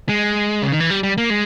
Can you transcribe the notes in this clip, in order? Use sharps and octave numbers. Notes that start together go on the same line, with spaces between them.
G#3
C#3
D#3
E3
G3
G3
A#3
G#3